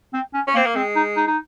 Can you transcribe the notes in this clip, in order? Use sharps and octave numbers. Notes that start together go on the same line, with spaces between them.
C4
C#4
C#4
A#3 C4
A#3
G#3 C4
D#4
D#4
D#4